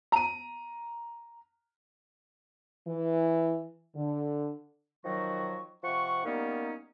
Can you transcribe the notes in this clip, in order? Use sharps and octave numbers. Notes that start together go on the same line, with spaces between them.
A#5 D#7
E3
D3
D#3 F3 F#3 F#4 C#6
C3 F3 F#5 C#6
G3 A#3 B3 C#4 D#4